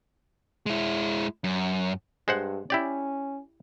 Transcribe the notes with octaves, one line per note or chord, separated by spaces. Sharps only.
G#3 E4
F#2
G2 G#3 C5 F#5
C#4 E4 G4 D5